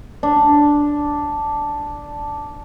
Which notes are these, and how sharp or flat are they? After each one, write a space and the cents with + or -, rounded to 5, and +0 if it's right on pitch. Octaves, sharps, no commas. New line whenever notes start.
D4 -5